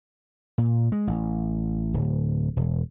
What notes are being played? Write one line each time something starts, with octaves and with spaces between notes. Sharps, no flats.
A#2
G#3
A1
D1
E1